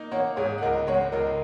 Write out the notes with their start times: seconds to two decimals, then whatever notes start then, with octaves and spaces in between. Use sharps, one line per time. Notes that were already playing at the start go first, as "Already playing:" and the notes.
Already playing: A#3 D#4
0.11 A#3 C#5 F#5
0.36 G#2 G#4 C#5
0.58 F#5
0.61 C#2 A#4 D#5
0.87 G#3 C#5 F#5
1.12 C#2 A#4 D#5